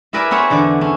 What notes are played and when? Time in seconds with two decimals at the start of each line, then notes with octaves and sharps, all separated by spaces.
0.13 E4 G#4 A#4 B4 D5 E5
0.31 B3 C4 G#4 C#5
0.50 E2 D3 E4 D5
0.81 C#4 D4